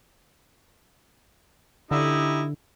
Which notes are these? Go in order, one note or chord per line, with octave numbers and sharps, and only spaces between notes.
D3 D#4 E4 G4